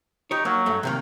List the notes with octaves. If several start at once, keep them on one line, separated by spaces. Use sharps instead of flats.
D#4 G4 C#5
F#3 A#3
G2 A3
C3 D#3 A#3